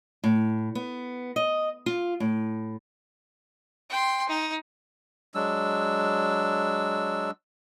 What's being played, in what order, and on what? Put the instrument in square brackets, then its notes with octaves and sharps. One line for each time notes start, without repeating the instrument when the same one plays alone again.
[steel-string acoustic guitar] A2
B3
D#5
F4
A2
[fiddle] G5 C6
D#4
[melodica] F#3 G#3 D4 E6